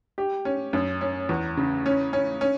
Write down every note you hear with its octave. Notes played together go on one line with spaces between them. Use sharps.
G4
C#4
F#2
C#4
E2
C#3
C#4
C#4
C#4